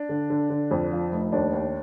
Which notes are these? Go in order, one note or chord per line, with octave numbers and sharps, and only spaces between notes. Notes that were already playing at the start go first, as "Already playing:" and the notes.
Already playing: D4
D3
D3
D3
F2
F3
F1
D#2 D4
D#2